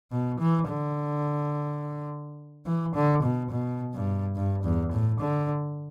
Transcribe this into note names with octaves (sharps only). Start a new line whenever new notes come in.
B2
E3
D3
E3
D3
B2
B2
G2
G2
E2
A2
D3